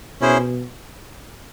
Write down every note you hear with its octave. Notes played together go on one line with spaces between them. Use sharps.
B2 C#4 E4 G#4 C5